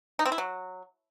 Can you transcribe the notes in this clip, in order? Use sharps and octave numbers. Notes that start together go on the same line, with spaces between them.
D#4
C4
E4
F#3